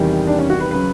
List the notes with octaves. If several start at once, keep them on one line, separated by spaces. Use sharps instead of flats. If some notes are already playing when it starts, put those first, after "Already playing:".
Already playing: E2 C3 D#3 G3
D4
C#4
F#4
B4
C#3 F#3 B4